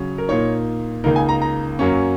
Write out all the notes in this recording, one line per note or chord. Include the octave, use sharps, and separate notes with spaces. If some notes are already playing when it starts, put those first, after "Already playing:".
Already playing: C#3 F#3 C#4
A#4
A#2 A#3 D#4 C#5
C#2 C#3 A#3 D#4 A#4
G#5
A#5
A#5
F#2 F#3 A#3 C#4